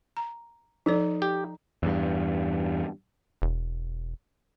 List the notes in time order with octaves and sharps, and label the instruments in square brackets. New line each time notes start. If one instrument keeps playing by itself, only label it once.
[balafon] A#5
[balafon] F3 A4 D5 [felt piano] D#4
[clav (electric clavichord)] G4
[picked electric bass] E2 G2
[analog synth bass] E1